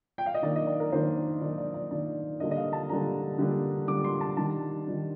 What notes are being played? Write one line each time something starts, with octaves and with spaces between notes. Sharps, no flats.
G5
F5
D#5
D#3 A#3 D4 D5
D#5
D5
A#4
D#3 A#3 D4 C5
D#3 A#3 D4 D5
D5
D5
D#3 A#3 D4 D5
D3 G3 A#3 D4 D#5
D#5
F5
A5
D3 G3 A#3 D4 A#5
D3 G3 A#3 D4
D3 G3 A#3 D4 D6
C6
A5
D#3 G3 D4 A5
D#3 G3 D4